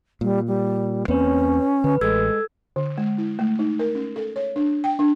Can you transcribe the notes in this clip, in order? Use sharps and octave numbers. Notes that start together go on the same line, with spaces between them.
A#2 G3
G3
E2 A#3 C4 C#4 B4 C#5
D3 B4
A1 G#3 A4 E6 G#6
D3
G#3
E4
A3
D#4
A#4
C#4
A4
C#5
D4
G5
D4